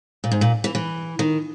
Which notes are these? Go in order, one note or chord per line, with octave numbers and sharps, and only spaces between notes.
A#2
G#2
A#2
E3
E3
D#3